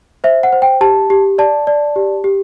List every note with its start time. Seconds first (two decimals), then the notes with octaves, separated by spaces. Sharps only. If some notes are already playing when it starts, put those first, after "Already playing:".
0.24 C5 E5
0.43 F#5
0.53 C5
0.62 G5
0.81 G4 A5
1.10 G4
1.38 D5 A5
1.67 D5
1.96 G4
2.24 G4